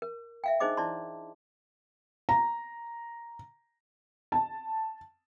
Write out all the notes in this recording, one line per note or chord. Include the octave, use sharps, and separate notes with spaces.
A#4
E5 F5 G5
D4 D#4 G#4 C5 D#5 D6
E4 D5 A5 C6
A#5
A5